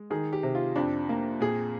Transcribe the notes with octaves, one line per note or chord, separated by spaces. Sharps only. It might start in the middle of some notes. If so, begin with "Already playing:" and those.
Already playing: G#3
D#3 G#4
G4
C3
F4
F2 D4
A#3
A#2 G#4